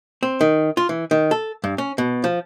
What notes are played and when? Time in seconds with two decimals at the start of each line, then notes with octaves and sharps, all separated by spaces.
0.23 C4
0.41 D#3
0.77 F4
0.89 E3
1.11 D#3
1.31 A4
1.64 G2
1.78 C#4
1.98 B2
2.24 F3